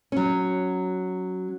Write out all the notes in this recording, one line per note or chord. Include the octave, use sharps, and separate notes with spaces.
F#3 C#4